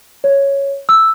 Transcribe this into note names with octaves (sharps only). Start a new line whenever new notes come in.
C#5
E6